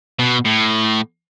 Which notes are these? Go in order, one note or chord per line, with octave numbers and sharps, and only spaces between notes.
B2
A2